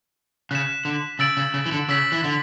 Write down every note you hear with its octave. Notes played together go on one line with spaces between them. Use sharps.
C#3 F#6 B6 E7
D3
C#3 E6 A6 D7 F#7
C#3
C#3
E3
D3
C#3 E6 B6 F#7
E3
D3